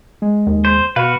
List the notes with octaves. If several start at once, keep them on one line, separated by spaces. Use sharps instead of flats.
G#3
D#2
C5
B2 F#4 B4 F5